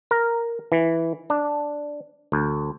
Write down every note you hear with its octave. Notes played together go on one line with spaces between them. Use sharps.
A#4
E3
D4
D2